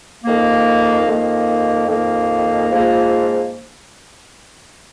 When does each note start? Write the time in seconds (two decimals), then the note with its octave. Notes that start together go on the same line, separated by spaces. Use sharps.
0.25 F2 D#3 A#3
1.07 F2 D#3 A#3
1.88 F2 D#3 A#3
2.70 G#2 F3 A#3 F4